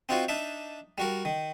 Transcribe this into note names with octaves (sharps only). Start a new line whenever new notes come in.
C4 D#4 F4 F#4 C5
D4 D#4 E5
G3 F#4 A#4
D#3